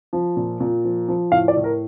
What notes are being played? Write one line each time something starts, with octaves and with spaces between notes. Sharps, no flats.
F3
A#2
A#2
F3
F3
A2 F5
D5
A2
A#4